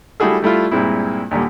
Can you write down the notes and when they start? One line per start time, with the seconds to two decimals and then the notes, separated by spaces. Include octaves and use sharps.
0.20 G3 A3 E4 F#4 G#4 A4
0.42 G3 A3 E4 F4
0.71 G2 A#2 G#3 C4 E4
1.31 D#2 A#2 D3 G3